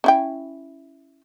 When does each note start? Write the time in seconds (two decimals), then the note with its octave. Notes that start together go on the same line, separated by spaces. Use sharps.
0.04 C#4 E4 G5